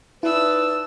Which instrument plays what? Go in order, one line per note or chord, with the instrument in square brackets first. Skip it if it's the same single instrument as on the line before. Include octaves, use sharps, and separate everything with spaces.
[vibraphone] D#4 D5 [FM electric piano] E4 [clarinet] B4 [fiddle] A5 E6